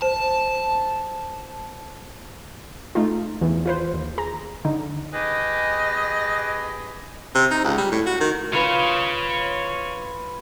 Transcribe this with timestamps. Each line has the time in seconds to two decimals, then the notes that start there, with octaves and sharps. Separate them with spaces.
0.02 C5 A5
2.95 A3 D#4 F4
3.41 E2
3.66 F4 B4 C5
3.94 D#2
4.18 G#4 A#5
4.65 D3 D#4
5.13 G4 G#4 B4 D#5
7.35 C3
7.51 D#4
7.64 C#2
7.78 G3
7.91 A2
8.06 F#4
8.20 D#3
8.53 F4 B4 C#5 F5 C6